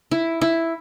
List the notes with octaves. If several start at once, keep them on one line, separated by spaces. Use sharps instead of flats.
E4
E4